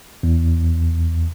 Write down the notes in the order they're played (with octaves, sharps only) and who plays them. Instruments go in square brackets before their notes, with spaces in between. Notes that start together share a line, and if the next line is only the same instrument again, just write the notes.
[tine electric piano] E2